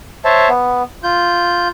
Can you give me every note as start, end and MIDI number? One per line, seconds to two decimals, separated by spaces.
0.25 0.48 72
0.25 0.48 73
0.25 0.48 76
0.25 0.48 81
0.49 0.83 59
1.03 1.68 65
1.03 1.68 91